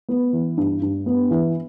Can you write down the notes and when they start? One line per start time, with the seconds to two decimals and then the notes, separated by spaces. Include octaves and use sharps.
0.09 B3
0.33 E3
0.57 G2
0.82 G2
1.06 B3
1.30 E3